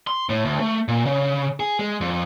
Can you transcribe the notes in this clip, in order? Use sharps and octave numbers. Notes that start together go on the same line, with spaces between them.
C6
A2
D2
A3
A#2
C#3
G#4
G#3
F2